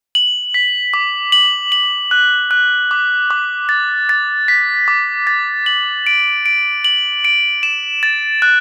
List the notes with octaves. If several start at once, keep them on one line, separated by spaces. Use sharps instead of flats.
F#7
B6
D6
F#7
F#7
F#6
F#6
D6
D6
A6
A6
B6
D6
A6
F#7
D7
D7
F#7
D7
E7
A6
F#6